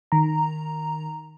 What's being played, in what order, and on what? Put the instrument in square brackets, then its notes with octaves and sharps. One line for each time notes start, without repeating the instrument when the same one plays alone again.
[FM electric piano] D#3 A#5